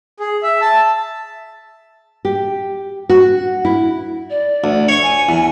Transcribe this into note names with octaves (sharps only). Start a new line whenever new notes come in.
G#4
E5
A5
G4
F#4
E4
D5
D2
C#5 C#6
G#5
E2